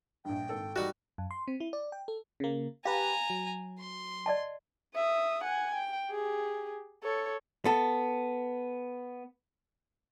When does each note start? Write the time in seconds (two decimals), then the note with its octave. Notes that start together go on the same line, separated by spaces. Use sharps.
0.25 A#1 G2 G5
0.49 G#1 A4
0.76 G3 D#4 F#4
1.18 F#2
1.31 C6
1.48 C4
1.60 E4
1.73 D5
1.92 G5
2.08 A4
2.40 C#3 A#3
2.85 G4 B4 F5 G#5 A#5
3.30 F#3
3.79 C6
4.26 D5 D#5 A5
4.95 E5 D#6
5.44 F#5 G#5
5.74 G5
6.10 G4 G#4
7.03 A4 C#5
7.65 B3 A4